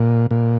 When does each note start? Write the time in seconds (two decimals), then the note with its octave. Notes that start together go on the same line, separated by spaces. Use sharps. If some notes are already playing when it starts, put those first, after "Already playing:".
Already playing: A#2
0.31 A#2